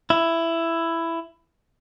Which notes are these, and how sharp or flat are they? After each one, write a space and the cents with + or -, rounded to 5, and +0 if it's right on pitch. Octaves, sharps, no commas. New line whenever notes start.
E4 +10